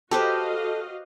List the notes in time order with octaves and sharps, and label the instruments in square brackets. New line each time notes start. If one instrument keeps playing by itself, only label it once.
[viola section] F#4 D#5 F5 [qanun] G4 B4 C5 [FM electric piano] A4